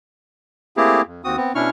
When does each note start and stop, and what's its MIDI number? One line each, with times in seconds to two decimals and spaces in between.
0.77 1.02 57
0.77 1.02 58
0.77 1.02 60
0.77 1.02 64
0.77 1.02 67
0.77 1.02 68
1.06 1.21 41
1.24 1.36 39
1.24 1.36 60
1.24 1.36 66
1.24 1.36 87
1.36 1.52 59
1.36 1.52 60
1.55 1.70 47
1.55 1.70 61
1.55 1.70 62
1.55 1.70 64
1.55 1.70 85
1.55 1.70 89